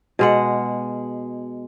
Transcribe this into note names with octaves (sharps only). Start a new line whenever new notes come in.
B2 G#3 F#5